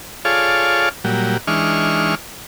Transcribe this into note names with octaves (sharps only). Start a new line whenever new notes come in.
F4 G#4 A4 C#5 D5 F5
A#2 F#3 G3
E3 G#3 D4 D#4 C#6 F6